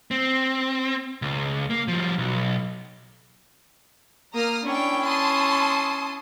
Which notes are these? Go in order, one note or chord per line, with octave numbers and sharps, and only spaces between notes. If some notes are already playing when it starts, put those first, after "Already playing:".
C4
C#2
A#3
F3 G3
B1
A#3 A#5 D#6 F6
C#4 D4 E4 G5
A5 C6 D#6